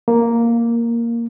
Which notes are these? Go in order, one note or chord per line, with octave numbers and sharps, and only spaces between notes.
A#3